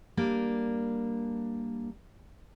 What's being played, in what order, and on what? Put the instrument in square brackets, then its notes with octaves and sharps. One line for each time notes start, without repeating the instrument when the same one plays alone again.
[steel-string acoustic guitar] G3 A#3 D4